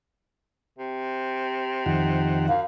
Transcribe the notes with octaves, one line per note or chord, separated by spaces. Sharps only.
C3
F2 D#3 F#5
F#2 F5